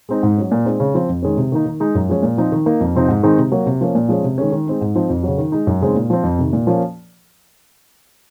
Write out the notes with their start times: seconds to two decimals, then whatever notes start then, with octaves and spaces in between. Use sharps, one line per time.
0.09 G#3 C4 D#4
0.23 G#2
0.38 F#3 C#4
0.51 A#2
0.65 G#3 C4 D#4
0.80 C#3
0.94 F3 C4
1.09 F2
1.22 D#3 G#3 C#4
1.37 C3
1.52 D#3 A#3 D#4
1.66 D#3
1.80 G#3 D#4
1.95 F#2
2.09 F3 G#3 C#4
2.23 A#2
2.37 F3 C4 D#4
2.52 D#3
2.66 A#3 D#4
2.80 F2
2.95 C3 F3 C4 D#4
3.08 G#2
3.23 D#3 G#3 C4 D#4
3.38 C3
3.52 F#3 A#3
3.66 C3
3.81 F3 A#3 C#4
3.95 A#2
4.09 F3 G#3 C#4
4.24 C3
4.38 D#3 G#3 C#4
4.52 D#3
4.67 G#3 C4 D#4
4.81 G#2
4.95 F3 C4 D#4
5.10 F2
5.23 C#3 F#3
5.38 D#3
5.52 G#3 D#4
5.67 F#2
5.81 C#3 G#3 C4 D#4
5.95 A#2
6.10 F3 C4
6.24 F2
6.39 C3 D#3
6.53 A#2
6.67 F3 A#3 C#4